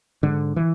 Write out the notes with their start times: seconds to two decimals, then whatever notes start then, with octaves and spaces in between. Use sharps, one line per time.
0.23 G#2 D3
0.56 E3